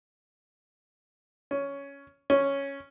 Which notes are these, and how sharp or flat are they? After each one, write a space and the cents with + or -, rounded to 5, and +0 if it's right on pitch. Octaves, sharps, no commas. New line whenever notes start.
C#4 +10
C#4 +0